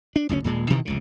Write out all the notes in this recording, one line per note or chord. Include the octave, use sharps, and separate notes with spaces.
D4
F#1 D2 C4 C#4
D#1 A#2 G#3
G2 B2 D#3 E3
F1 C#2 C#3